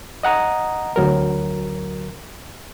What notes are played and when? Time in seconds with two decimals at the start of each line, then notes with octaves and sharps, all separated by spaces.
0.23 D#5 F#5 A#5 D#6
0.96 D2 F#3 A#4